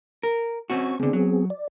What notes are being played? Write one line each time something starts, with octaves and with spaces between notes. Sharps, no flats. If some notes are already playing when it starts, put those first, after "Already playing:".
A#4
C4 C#4 F#4 C#6
C#2 D3 B3 C4 G#4
F#3
D5